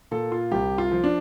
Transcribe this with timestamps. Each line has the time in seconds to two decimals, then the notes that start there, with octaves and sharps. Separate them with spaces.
0.11 A#2 A4
0.32 F4
0.51 C2 G4
0.78 F4
0.91 F3
1.04 D4